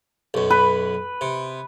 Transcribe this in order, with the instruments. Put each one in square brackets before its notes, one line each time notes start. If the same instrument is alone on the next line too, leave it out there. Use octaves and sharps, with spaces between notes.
[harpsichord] B1 F#2
[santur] B4
[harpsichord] C3